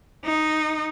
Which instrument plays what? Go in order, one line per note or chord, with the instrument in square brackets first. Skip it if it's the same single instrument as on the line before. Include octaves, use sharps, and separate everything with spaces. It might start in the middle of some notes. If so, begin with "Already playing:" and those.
[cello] D#4